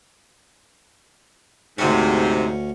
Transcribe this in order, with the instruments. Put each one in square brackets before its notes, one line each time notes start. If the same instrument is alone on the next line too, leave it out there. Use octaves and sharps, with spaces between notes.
[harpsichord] D2 C#4 [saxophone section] G#2 C3